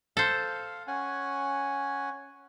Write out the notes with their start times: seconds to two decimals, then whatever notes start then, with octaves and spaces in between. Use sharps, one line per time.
0.17 A4 C5 F5
0.87 C#4 F#5 G#5